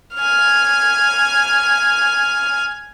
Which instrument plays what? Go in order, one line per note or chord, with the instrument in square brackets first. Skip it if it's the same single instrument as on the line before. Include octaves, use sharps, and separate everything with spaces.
[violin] G#5 F6